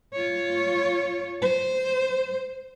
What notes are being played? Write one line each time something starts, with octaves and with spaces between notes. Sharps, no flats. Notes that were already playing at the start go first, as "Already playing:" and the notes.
F4 C#5
C5